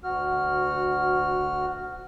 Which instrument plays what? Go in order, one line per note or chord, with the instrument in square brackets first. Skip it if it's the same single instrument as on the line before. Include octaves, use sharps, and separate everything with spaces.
[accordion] D2 F#4 F6